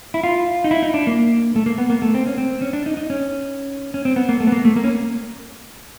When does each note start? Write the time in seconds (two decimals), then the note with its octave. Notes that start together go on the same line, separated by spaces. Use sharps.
0.14 E4
0.23 F4
0.64 D#4
0.71 E4
0.83 D#4
0.94 D4
1.07 A#3
1.56 A3
1.66 A#3
1.78 B3
1.90 A#3
2.02 A3
2.14 C4
2.26 C#4
2.38 C4
2.62 C#4
2.73 D4
2.86 D#4
2.97 D#4
3.10 C#4
3.94 C#4
4.05 C4
4.16 B3
4.29 A#3
4.40 A3
4.47 B3
4.52 A#3
4.65 A3
4.77 A#3
4.84 C#4